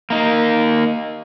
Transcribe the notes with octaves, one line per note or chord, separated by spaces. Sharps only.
A#3 D#4